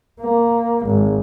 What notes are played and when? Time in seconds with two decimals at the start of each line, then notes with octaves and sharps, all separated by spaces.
0.21 A#3
0.87 G#1